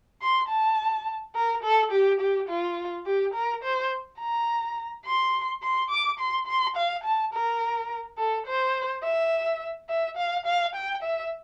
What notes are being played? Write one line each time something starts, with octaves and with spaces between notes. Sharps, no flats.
C6
A5
A#4
A4
G4
G4
F4
G4
A#4
C5
A#5
C6
C6
D6
C6
C6
F5
A5
A#4
A4
C5
E5
E5
F5
F5
G5
E5